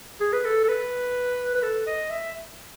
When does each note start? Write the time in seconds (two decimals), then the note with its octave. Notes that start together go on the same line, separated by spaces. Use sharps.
0.21 G#4
0.33 B4
0.45 A4
0.64 A4
0.68 B4
1.55 B4
1.62 A4
1.87 D#5
2.10 E5